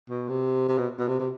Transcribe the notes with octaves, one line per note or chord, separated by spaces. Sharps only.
B2
C3
C3
B2
B2
C3
C3